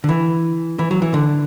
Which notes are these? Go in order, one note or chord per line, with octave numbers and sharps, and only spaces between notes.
D3
E3
E3
F#3
E3
D3